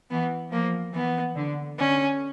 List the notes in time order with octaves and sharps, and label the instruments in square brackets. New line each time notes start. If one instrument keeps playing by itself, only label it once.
[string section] E3 [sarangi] B3
[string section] F3 [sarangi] A#3
[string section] E3 [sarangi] B3
[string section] D3
[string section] D3 [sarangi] C#4